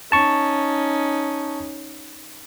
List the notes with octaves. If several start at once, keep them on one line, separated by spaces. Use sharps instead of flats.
C#4 D#4 A5 C#6